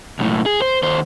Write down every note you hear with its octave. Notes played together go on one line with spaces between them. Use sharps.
B1 A2
G#4
C5
D#2 C5